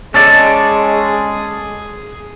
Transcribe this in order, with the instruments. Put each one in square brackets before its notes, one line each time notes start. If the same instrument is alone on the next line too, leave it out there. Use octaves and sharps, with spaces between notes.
[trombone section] G#3 [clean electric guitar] C#4 A4 D5 [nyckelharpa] G#4